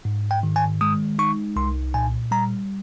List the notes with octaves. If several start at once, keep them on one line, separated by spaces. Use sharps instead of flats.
G#2
G5
D#3
G#5
G#3 D#6
D#4 C#6
C2 C6
A#2 G#5
G3 A#5